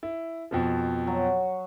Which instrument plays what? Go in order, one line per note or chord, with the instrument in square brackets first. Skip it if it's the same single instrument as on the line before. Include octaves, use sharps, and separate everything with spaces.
[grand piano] E4
F2 B2 F3
[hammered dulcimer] F#3